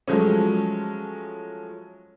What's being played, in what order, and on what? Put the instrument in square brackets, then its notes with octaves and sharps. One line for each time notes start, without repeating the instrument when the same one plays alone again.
[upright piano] F3 F#3 G#3 A3 C#4